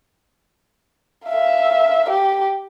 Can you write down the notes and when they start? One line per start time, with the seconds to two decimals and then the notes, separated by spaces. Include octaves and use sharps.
1.27 E5 F5
2.09 G4